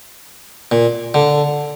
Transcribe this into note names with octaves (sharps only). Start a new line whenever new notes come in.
A#2
D3